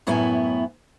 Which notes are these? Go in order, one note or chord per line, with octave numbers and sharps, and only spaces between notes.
F#2 A2 B3 E4 E5 G#5